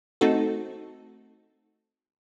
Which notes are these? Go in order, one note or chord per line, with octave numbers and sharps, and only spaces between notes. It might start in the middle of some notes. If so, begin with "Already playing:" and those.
A3 C4 D#4 F#4 A4